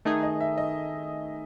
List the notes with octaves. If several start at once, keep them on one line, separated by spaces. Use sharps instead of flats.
D#3 A3 D#4 G#4
D#5
E5
D#5